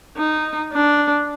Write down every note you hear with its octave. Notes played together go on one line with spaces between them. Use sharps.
D#4
D4